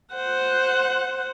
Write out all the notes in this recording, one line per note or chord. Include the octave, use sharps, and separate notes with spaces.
C5 F#5